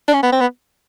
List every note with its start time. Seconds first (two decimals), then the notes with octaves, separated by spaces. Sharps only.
0.08 D4
0.14 C#4
0.23 B3
0.32 C4
0.41 B3